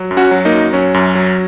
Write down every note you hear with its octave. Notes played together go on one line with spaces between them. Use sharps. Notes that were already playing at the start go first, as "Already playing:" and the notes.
Already playing: F#3
F#2
C#4 F#4
F#3
A#3 D#4
F#2
F#3 C#4
F#2
F#3